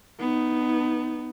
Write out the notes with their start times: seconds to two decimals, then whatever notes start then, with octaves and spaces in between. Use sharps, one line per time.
0.20 B3 D#4